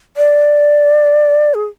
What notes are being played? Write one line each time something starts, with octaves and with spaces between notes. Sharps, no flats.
D5
G#4